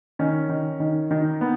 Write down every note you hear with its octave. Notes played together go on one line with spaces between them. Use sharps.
D#3 C#4
D#3
D#3
D#3 D#4
B3